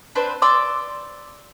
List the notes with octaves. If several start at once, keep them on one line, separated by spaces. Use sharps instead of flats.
C4 D4 B4 C5
D5 C6 D6 E6